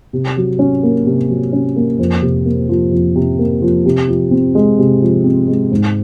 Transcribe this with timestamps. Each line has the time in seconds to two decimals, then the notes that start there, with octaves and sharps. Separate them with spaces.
0.13 C3
0.37 F#3
0.59 C#4
0.83 A#3
1.06 C3
1.29 F#3
1.53 C#4
1.76 A#3
1.99 F2
2.22 C3
2.45 A#3
2.69 F3
2.92 F2
3.16 C3
3.39 A#3
3.62 F3
3.86 C3
4.08 F3
4.31 C4
4.55 G#3
4.79 C3
5.02 F3
5.24 C4
5.48 G#3
5.72 G#2